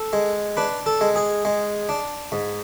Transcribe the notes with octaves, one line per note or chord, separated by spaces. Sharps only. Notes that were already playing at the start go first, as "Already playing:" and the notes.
Already playing: A4
G#3
D4 B4
A4
G#3
G#4
G#3
D4
G#2